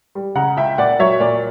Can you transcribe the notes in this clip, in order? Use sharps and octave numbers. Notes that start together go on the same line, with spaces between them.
G3
C#3 F#5 A#5
C#2 E5 G5
A#2 D5 F#5
F#3 C#5 E5
A#2 D5